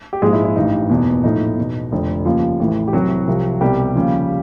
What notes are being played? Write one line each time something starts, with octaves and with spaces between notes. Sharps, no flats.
G4
A#1 G#2 F3 G#3 G#4
E4
E4
A1 G2 E3 D#4
F#1 E2 B2
A#1 A2 F3 D#4
E2 B2
F1 F2 D3
D#2 C#3 F3 F4
A1 A2 E3
G4
C2 C3 E3 F#3 F#4
C2 C3 F3
C2 B2 G3 G4
D#2 C#3 F3